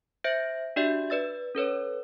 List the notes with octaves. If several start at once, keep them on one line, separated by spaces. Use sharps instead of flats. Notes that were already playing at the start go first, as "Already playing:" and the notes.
C5 E5 G6 A#6 D7
D4 F#4 G4 D5 E5 G6
B4 D5 E6 A6
C#4 A4 B4 C#5